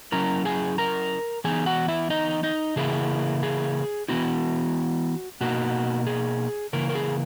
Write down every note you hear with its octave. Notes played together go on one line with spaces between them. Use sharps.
F#3 C#4 E4 A#4 A#5
G#4 G#5
A#4 A#5
E3 B3 D#4 G#4 G#5
F#4 F#5
E4 E5
D#4 D#5
D#4 D#5
C#3 E3 A#3 E4 G#4
G#4
E3 B3 E4 F#4
B2 A#3 D#4 F#4
G#4
C#3 E3 A#3 A#4
A#4
G#4